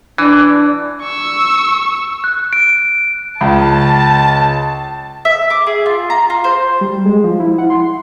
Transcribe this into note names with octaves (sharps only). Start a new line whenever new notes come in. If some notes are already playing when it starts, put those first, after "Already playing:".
E3 D4
C#6 E6
F#6
D7
C#2 A5
E5
D6
G#4
F4
A#5
F4
C5
G3
G#3
F3
E4
F#5
C6